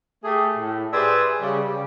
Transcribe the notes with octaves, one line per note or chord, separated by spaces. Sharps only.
A3 G4 G#4
A2
G4 G#4 B4 C5 D5 E5
C#3 G3
C#3 G3